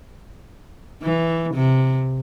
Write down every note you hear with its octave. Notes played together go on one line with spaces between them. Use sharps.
E3
C3